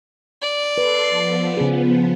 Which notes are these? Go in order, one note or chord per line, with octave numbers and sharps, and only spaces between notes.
D5
A4 B4 C6 C7
F3 B3
C#3 G#4